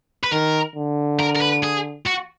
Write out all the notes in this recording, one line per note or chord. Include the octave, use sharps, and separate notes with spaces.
B4
D#3 A#4
D3
A#4
A#4
B4
G#4
F#4